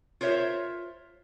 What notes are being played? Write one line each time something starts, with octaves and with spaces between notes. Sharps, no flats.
F4 A#4 C5 C#5 E5